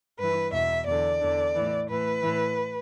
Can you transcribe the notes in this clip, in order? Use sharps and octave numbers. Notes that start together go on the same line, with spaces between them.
G2 E3 B4
E2 B2 E5
E2 D3 D5
E2 D3
A2 E3
A2 E3 B4
A2 E3